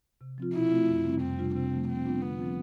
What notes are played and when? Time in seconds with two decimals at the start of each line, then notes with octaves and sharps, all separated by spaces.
0.21 C3
0.38 F3 C4 F4
0.55 B2 E4
0.72 A3 C4 F4
0.88 F2
1.05 C3 G3 C4
1.21 F2 C4
1.38 C3 G3 D4 F4
1.55 C3 C4
1.72 F3 A3
1.88 C3 C4
2.06 G3 B3 D4 F4
2.21 D3 B3
2.38 F3 C4 F4